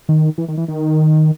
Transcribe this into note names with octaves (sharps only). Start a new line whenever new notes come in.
D#3
E3
D#3
E3
D#3